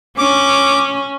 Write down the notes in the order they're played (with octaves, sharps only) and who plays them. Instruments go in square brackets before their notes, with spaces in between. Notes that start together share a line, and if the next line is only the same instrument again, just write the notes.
[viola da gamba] C#4 [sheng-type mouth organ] D6